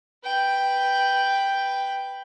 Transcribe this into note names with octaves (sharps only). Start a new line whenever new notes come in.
B4 G5